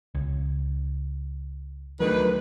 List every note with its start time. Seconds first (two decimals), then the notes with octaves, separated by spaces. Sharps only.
0.15 C#2
2.00 D2 D#3 F#3 A3 B4